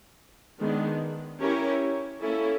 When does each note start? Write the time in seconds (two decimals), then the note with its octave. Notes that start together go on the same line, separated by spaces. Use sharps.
0.60 D#3 G#3 B3 D4
1.40 C#4 E4 G4 A#4 C#5
2.20 A#3 C#4 E4 A4